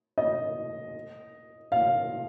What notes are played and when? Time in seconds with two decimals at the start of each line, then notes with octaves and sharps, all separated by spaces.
0.18 D#5
1.72 F5